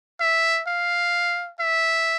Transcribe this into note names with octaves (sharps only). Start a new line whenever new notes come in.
E5
F5
E5